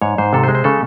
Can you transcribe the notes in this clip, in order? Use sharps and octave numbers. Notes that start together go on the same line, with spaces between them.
G#2 C#5
G#2 C5
C3 A4
C5
G#3
C5
C#3 A4